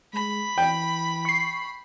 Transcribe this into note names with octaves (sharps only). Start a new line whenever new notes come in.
G#3 B5
E3 G5
C#6 C7